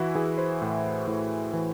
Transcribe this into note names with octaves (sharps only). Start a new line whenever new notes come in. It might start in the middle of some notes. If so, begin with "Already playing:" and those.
Already playing: E3 E4 F#4
E3 G#4
C5
A2
A2
E3